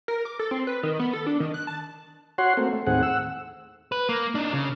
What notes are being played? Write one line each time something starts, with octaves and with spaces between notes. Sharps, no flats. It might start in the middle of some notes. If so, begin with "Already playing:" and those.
A#4
D6
A4
C4
B4
D#3
B3
A4
D4
D#3
F#6
A5
F#4 C#5 F#5 C6
A3 A#3 C4
A3
D#2 A2 C4 G#4 F#5
F#5 E6
B4
A#3
D4 D#4
C#3